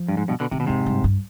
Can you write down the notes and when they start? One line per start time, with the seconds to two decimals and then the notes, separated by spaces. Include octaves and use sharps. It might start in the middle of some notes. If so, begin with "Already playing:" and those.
Already playing: F3
0.08 G2
0.17 G#2
0.28 G2 B2
0.40 B2 D3
0.51 C3 D#3
0.60 B2
0.66 F2 G#2 C3
0.86 G2
1.04 G2